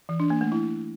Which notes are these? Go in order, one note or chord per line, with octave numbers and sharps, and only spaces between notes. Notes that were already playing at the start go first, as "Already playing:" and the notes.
E3
D4
A#3
A3
E4